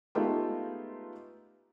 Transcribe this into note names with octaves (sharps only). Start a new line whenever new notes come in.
G#3 A3 B3 D#4 F4 G4